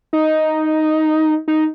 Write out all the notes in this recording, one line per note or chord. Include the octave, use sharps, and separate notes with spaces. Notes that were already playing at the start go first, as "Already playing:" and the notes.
D#4
D#4